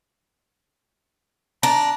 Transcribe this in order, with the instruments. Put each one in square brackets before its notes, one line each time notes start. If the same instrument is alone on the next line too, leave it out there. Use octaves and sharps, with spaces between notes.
[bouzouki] D4 [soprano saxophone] A#5